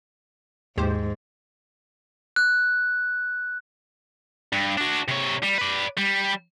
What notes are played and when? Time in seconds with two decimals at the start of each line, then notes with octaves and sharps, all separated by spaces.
0.77 D#2 G#2 G4 C5
2.36 F#6
4.53 G2
4.78 D4 F#4
5.08 C3 C#5
5.43 G3
5.58 B4 D5
5.98 G3